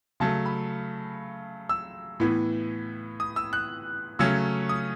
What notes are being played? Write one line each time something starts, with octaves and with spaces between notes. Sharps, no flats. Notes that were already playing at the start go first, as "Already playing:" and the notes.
C#3 F#3 A3 A5
B5
E6
A2 E3 B3
D#6
E6
F#6
C#3 F#3 A3 C#4 E6
D#6